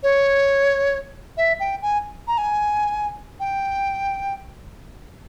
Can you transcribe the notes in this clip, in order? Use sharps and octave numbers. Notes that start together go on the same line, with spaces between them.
C#5
E5
G5
G#5
A#5
G#5
G5